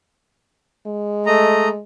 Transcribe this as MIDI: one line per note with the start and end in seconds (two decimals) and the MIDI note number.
0.87 1.80 56
1.26 1.68 57
1.26 1.68 75
1.26 1.68 82